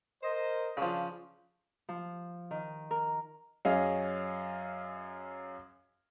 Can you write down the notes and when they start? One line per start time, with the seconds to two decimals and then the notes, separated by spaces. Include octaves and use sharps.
0.23 A#4 C5 D#5
0.77 C#3 F3 D4
1.89 F3
2.51 D#3
2.91 A#4
3.65 F#2 C#4 G#4 D#5 F5